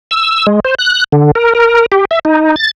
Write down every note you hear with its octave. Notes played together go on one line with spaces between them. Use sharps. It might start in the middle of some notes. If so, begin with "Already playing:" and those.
E6
G#3
C5
F#6
D3
A#4
A#4
G4
E5
D#4
A6